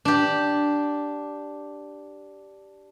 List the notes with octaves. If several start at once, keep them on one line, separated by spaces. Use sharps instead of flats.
D4 G4